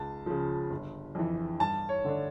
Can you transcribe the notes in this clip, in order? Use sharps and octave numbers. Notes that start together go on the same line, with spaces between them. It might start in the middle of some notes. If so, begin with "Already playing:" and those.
Already playing: C#2 A5
C#3 F3
G1
F2 E3
G2 A5
C#5
D3 A3 D4